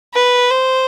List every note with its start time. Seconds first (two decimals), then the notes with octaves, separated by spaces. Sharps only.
0.14 B4
0.50 C5